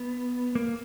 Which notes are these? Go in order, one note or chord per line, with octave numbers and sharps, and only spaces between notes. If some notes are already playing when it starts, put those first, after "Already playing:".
Already playing: B3
A#3